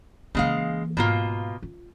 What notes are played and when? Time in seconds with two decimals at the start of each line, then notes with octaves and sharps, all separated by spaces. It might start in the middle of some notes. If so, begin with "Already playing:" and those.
0.35 C#3 E3 G#3 A#3 F5
0.97 G#2 B2 A#3 F4
1.62 F4